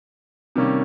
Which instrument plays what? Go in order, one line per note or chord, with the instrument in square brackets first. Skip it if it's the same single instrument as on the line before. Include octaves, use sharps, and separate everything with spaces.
[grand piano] C3 D#3 G3 A#3 C#4